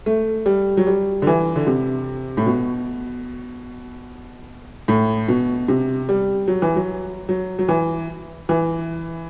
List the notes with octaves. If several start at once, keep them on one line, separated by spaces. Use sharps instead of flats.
A3
G3
F#3
G3
D3
E3
D3
C3
A2
B2
A2
B2
C3
G3
F#3
E3
F#3
F#3
F#3
E3
E3